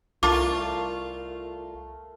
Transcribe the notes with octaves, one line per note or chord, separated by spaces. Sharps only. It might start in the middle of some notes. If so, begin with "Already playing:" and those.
C2 A3 F4 A#4 A5 D6